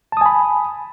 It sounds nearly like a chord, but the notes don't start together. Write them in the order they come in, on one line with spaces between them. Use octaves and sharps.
A5 D#6 G#5 B5